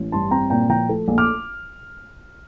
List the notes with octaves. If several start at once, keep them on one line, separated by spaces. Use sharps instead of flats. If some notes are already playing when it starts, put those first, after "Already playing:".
Already playing: A1
G2 A5 C6
C4 G5 A#5
A#2 G5 A#5
F3 G5 A#5
A3
A#1
D6 F6